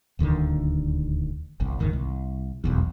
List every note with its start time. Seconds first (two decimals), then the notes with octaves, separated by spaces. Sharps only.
0.19 D#1 D2 D3 D#3
1.60 G1 C2
1.80 F#1 C#2 G#2 D#3
1.93 C2
2.64 F1 B1 E2